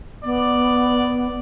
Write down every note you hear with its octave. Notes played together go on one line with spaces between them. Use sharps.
B3 D5